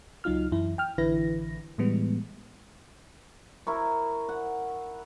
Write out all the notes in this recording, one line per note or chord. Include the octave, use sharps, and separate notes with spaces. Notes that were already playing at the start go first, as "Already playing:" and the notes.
C#2 F#3 D#4 F4 F6
F#2 E3 E4
G5 F6
A1 D3 E3 E4 B4 A#6
A2 E3 G3 G#3 B3
E4 A#4 C#6
F#5